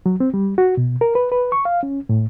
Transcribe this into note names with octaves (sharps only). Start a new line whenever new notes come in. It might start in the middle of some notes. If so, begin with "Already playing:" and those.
F#3
C4
G3
F#4
B2
A#4
B4
B4
C#6
F5
C#4
A2